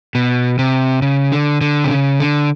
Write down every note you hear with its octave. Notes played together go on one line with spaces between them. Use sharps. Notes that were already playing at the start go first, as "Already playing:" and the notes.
B2
C3
C#3
D3
D3
C3
C#3
D3